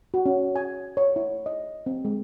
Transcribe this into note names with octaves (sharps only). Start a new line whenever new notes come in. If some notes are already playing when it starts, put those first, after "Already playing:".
F#4
C#4
G#5
C#5
E4
D#5
C4
G#3